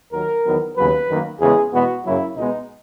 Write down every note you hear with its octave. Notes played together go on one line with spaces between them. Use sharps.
D#2 D#3 F#3 A#4
E2 D#3 F#3 B3
D#2 C#3 F#3 B3 B4
F#2 D#3 F#3 A#3
E2 C#3 G#3 B3 G#4
E2 B2 G#3 B3 F#4
F#2 C#3 F#3 A#3 E4
C#2 B2 G#3 B3 D#4